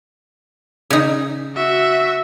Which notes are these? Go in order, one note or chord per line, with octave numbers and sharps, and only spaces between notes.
C#3 D#4
F#4 E5